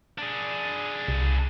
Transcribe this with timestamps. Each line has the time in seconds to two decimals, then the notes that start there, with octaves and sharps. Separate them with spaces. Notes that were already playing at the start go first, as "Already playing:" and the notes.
0.18 D4 G#4
1.08 C2